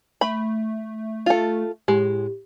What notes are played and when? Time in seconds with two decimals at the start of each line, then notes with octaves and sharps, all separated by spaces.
0.21 A3 B5
1.26 F4 A4
1.88 A2 G#3 G4